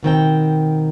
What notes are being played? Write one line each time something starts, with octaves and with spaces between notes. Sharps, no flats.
B2 D#3 C4 G5